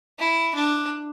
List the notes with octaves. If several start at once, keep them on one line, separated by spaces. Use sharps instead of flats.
E4
D4